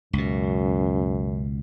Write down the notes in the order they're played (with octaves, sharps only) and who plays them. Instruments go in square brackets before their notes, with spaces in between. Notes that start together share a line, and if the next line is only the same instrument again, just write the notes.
[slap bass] C#2 B2 [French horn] F#2